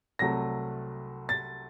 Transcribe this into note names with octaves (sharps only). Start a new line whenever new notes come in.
C2 C3 F#3 A3 A#6
A6